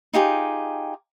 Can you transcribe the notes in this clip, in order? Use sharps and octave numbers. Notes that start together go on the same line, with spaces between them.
D#4 F4 G4 G#4